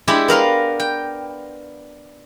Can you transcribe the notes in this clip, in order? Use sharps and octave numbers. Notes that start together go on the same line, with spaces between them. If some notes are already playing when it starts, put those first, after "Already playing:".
G#3 D4 E4 G4
B3 A#4 F5 C6
G5